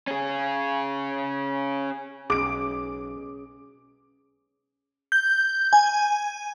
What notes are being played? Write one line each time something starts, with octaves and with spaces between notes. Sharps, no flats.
C#4 G#4
B1 C#4 G#4 D6 D7
G6
G#5